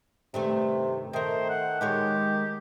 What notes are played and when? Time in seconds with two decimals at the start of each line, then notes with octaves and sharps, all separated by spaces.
0.34 G2 C3 D#3 A3
1.13 D#3 A3 A#4 C5
1.50 F#5
1.81 D#3 G#3 G4 G#4 C#5